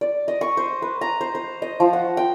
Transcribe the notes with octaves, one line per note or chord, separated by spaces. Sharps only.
D5
D#5
C#6
C5
B4
A#5
C5
C5
D#5
F3
F#5
G5